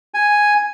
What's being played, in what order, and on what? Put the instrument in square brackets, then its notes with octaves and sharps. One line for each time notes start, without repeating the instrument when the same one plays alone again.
[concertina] G#5